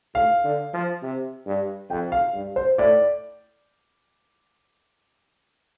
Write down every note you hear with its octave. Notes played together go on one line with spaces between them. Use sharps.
A2 F5
D3
F3
C3
G2
F2 G5
F5
G2
C5
A2 D5